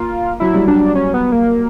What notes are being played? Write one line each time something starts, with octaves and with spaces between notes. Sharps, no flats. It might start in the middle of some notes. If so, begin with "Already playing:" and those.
Already playing: A#3 F4
F#3 E4
G3
F#3 D4
C#4
B3
A#3